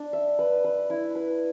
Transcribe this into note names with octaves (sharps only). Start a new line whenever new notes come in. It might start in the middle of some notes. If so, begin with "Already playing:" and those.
Already playing: D4
E5
B4
B4
E4
B4